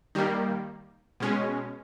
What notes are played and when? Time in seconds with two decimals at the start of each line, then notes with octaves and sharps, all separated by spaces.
0.15 D#3 G3 A#3
1.20 B2 G#3 C#4